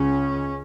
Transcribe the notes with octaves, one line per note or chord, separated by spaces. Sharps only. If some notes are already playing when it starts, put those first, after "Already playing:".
Already playing: C#2 C#3 C#4